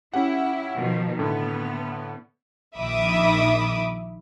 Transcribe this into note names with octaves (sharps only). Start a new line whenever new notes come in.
C#4 E4 G4 F#5
B2 D#3 F3
A2 D3 B3
A#1 D#3 E5 B5 D6 D#6